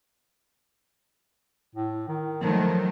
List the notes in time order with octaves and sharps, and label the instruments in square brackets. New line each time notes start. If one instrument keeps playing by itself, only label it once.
[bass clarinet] A2
D#3
[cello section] D#3 F#3 A3 [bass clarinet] F3